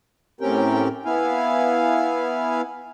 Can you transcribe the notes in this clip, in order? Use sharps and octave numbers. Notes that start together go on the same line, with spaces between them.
A2 C4 C#4 G4 A#4 G5
B3 E4 F5 G#5